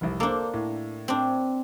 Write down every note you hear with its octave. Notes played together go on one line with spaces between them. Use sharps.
F1 C2
A#3 D4 A4 C5
A2
C4 D4